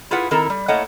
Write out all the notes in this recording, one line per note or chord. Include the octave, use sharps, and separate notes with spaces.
E4 F4 G#4 B4 F#5
D#3 C4 E4 A4 A#4
G3
A3 A#3 E4 C#5 D#5 F#5